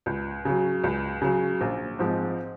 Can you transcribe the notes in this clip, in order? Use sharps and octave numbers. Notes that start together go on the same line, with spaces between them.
C#2
C#3 F#3
C#2
C#3 F#3
A#1
G#2 F3 G#3 C4